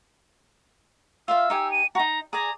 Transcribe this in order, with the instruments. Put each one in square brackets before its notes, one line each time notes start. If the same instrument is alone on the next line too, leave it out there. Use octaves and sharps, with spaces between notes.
[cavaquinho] F4 E5 F5 [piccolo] E6
[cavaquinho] D#4 G4 G#5
[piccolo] D#7
[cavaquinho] D#4 F#4 [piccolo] A#5
[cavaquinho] G#4 D5 G#5 [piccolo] A#5